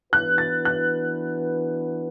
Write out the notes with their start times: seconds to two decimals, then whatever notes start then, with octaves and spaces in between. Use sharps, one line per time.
0.12 E3 B3 D4 F#4 B4 F#6
0.38 A6
0.65 F#6